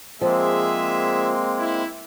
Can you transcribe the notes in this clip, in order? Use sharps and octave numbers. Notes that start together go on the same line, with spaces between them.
F3 G#3 A#3 C4 G#4 E5
E4